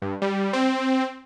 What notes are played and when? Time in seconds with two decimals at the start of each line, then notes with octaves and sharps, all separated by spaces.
0.02 G2
0.22 G3
0.53 C4